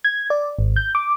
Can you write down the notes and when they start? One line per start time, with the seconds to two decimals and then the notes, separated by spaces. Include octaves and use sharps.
0.04 G#6
0.30 D5
0.59 G#1
0.76 G6
0.95 D6